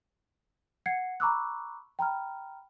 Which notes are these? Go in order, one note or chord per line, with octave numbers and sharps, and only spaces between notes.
F#5 G#6 C7 C#7
A#5 B5 C#6 D6 E6 F#6
G5 A#5 B5 F6